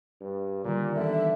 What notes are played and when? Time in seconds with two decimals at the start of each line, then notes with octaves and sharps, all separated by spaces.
0.21 G2
0.64 A#2 D3 D#3 G3
0.96 D3 E3 B3 E5